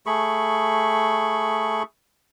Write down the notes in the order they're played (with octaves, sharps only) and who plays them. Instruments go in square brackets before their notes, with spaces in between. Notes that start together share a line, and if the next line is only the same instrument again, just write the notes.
[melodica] A3 G#4 B5 C#6